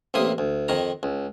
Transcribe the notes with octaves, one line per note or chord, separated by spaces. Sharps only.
A1 C3 A#3 D#6
D2
F2 D#3 A#5
C#2